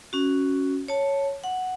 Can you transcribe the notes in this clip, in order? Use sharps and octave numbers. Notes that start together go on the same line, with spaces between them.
C#4 F#4
C#5 A5
F#5